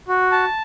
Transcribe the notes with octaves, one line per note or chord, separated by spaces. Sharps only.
F#4
A5